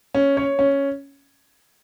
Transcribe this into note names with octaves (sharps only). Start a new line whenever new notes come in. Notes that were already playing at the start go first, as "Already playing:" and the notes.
C#4
C#5
C#4